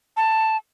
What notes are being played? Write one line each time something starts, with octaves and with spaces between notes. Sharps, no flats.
A5